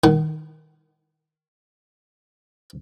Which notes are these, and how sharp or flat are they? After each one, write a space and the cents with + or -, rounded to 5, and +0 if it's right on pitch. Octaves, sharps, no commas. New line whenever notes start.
D#3 +0 F#5 +35